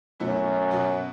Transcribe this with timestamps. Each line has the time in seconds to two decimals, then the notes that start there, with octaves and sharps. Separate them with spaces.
0.20 F#2 B2 F#3 A3 E4
0.71 B2 F#3 B3